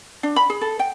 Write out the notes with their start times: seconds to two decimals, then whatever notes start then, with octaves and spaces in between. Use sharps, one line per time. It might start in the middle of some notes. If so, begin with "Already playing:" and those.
0.23 D4
0.36 B5
0.50 G#4
0.61 A4
0.79 G5